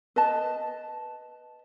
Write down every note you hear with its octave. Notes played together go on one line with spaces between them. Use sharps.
B4 D#5 A5